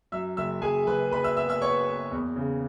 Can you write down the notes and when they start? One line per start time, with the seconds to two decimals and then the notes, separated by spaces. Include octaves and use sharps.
0.12 F#2 E5 E6
0.37 F#1 E5 E6
0.62 F#1 G#4 G#5
0.87 F#1 B4 B5
1.11 F#1 B4 B5
1.24 E5 E6
1.37 B3 E5 E6
1.49 E5 E6
1.62 B3 C#5 C#6
1.86 B3
2.11 E2
2.36 C#3